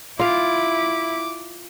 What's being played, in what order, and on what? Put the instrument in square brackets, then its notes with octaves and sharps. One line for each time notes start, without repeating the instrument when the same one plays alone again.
[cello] E4 [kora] F4 F5 [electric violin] D6